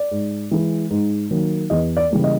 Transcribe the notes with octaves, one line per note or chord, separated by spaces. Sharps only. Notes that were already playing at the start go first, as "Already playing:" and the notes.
Already playing: D5
G#2
E3 G#3
G#2
D#3 F#3 A#3
E2 D#5
D5
C#3 E3 G3 A#3
D#5